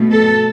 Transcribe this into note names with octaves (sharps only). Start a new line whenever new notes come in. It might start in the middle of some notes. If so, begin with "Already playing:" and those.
Already playing: B2 A3
A4